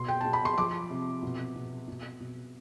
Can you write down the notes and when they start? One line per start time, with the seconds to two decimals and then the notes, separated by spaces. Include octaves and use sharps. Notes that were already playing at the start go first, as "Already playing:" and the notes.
Already playing: B2 C6
0.08 G5
0.21 B2 A5
0.33 B5
0.45 C6
0.58 F3 D6
0.90 C3
1.23 B2
1.56 B2
1.88 B2
2.20 B2